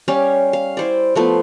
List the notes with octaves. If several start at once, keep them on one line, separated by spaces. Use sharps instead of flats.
G3 C#4 G4 F5
F5
E4 C5 D5
F3 A3 B3